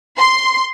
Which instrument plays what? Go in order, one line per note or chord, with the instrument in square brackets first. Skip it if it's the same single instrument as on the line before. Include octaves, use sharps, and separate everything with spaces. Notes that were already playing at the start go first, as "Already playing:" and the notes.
[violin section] C6